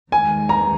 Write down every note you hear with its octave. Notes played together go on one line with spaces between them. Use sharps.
D#2 D#3 G#3 G#5
A#5